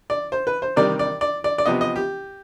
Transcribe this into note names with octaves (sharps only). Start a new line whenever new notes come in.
D5
C5
B4
C5
C3 D#3 G3 D5
D5
D5
D5
D5
C3 F3 B3 D#5
D#5
G4